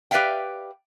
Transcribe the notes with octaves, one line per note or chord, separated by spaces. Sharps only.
G4 B4 D5 E5 F5 G5